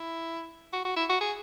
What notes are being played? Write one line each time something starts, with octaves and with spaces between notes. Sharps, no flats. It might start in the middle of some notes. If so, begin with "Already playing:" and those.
Already playing: E4
F#4
F#4
E4
F#4
G#4